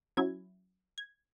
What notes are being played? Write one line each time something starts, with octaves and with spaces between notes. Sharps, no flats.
F#3 C#4 E4 G#6
G#6